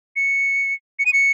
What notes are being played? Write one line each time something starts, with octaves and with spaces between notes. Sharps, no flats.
C#7
C#7
D#7
C#7